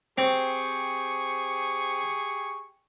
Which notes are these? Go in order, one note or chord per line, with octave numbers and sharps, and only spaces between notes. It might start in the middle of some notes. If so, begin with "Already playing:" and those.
C4 G4 G#4 C#6